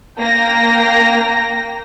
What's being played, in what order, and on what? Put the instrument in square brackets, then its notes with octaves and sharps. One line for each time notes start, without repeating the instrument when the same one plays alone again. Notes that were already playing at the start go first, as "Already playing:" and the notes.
[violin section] A#3 G5 A#6